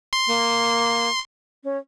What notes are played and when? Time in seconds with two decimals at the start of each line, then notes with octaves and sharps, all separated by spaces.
0.13 C6
0.27 A#3
1.64 C#4